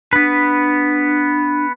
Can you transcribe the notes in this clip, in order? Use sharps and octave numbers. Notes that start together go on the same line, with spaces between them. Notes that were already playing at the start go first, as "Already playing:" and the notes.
B3 D4 B4